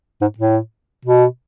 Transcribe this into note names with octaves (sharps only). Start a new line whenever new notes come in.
G#2
A2
B2